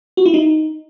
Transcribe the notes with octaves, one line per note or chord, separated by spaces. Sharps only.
F#4
E4
D#4